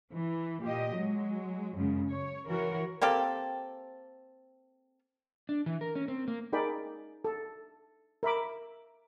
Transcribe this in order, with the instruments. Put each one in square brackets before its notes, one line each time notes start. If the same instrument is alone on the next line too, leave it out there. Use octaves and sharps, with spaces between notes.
[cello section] E3
A#2 G4 D#5
F#3 G#3
F#2 C#3 G#3
C#5
E3 F#4 A#4 C#5
[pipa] A#3 C4 G4 A4
[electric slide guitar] D4
E3
A#4
C#4
C4
A#3
[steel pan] D#4 G#4 A#4 D5 G5 B5
A4
A#4 E5 B5 D6